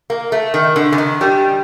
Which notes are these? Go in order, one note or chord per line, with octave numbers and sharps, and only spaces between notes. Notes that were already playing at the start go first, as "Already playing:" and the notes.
A#3
A3
D#3
D3
D3
D#3
G3